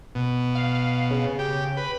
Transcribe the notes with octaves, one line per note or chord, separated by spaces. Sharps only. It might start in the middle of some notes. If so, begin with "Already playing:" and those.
B2
F5
C#3
G4
B4